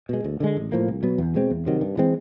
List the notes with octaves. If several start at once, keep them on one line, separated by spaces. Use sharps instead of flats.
B2 G#3
D2
D3 F3 G#3
A1
A2 F3 A#3
C2
B2 F#3 B3
E2
B2 G#3 C4
E2
C3 D#3 F#3
G2
E3 G#3 C4